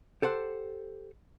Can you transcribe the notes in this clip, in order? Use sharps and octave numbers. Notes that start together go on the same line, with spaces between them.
G4 A4 C5 F#5